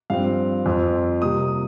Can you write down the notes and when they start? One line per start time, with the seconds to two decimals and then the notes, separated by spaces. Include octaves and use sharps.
0.10 G2 F3 C4 F5
0.66 F2 F3 C4
1.22 C3 G3 A#3 D#6